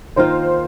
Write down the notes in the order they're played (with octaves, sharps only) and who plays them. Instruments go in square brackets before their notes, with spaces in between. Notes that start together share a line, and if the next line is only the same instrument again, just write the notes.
[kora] D#3 A#3 F4 [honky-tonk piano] C5